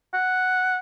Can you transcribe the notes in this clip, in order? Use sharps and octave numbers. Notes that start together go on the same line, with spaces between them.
F#5